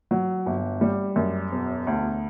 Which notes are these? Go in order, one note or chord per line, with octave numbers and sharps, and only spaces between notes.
F#3
G1
G3
F#2
E1
D2